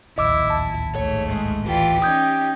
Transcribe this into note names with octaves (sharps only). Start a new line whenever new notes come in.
D1 A#1 D#2 E4 D#5 D6 E6
A5
G#2 A3 C#5
G#3
E3 F4 G4 D5 G5
C#4 D#4 D#6 G6 G#6